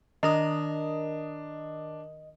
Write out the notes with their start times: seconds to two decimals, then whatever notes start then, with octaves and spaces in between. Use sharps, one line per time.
0.23 D#3 D4 A#4 D#5 D#6